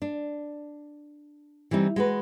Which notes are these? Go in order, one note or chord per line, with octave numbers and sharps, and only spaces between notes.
D4
E3 G3 C4 D#4
G#3 F#4 B4